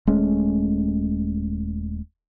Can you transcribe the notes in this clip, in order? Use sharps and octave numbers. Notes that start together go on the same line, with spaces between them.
D#1 G#3 A3 C#4